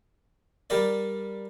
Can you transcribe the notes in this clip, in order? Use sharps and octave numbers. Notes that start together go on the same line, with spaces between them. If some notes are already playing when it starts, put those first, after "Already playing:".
G3 G4 A#4 D5